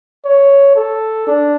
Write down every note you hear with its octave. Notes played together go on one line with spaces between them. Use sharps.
C#5
A4
D4